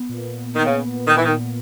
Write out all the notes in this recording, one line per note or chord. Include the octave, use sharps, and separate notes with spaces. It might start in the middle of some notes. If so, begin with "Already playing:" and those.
Already playing: B3
A#2
B3
D#3
C#3 B3
B3
D#3
E3
A#2 D#3